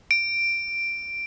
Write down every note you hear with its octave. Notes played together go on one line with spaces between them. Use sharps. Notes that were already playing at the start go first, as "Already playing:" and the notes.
D7